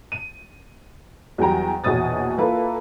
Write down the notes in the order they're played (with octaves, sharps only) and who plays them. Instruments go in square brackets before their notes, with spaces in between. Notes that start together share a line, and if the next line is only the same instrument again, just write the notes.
[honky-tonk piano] D#7
E2 F#3 G3 G5 A#5
A#1 E2 B2 C#5 D#6 A6
A#3 E4 F4 A4 B4